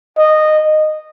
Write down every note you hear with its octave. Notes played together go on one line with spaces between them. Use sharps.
D#5